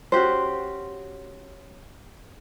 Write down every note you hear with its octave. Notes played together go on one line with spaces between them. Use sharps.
C#4 F#4 G4 C5